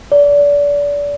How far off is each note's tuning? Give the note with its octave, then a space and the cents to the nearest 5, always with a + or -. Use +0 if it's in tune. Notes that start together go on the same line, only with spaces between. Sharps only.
D5 -30